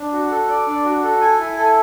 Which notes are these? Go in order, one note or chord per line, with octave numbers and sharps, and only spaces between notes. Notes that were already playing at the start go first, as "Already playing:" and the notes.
Already playing: D4
F#4
A4
D5
D4
F#4
A4
G#5
E4
A4